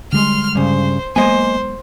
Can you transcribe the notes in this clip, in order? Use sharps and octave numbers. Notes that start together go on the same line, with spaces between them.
D3 G3 G#3 C6 F6
G2 C#3 C5
F#3 G#3 A#3 B3 C5 D#5 G#5